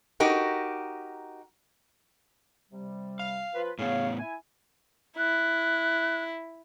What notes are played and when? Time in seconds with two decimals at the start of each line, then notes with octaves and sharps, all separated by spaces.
0.20 D#4 F#4 G4 A#4
2.72 C3 G3
3.19 F5
3.55 F3 F4 B4
3.79 A2 B3 G#4 C#5 F5
4.19 E4 G#5
5.17 E4 F#6